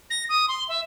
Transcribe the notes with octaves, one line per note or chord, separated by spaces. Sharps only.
A#6
D#6
C6
E5